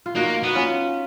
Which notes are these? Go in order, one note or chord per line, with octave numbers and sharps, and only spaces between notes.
F4
A#3 D#4 F#4
B3 F#4
C#4 F4